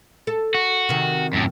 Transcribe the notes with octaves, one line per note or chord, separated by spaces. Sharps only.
A4
F#4
C3 D#3
F#2 A2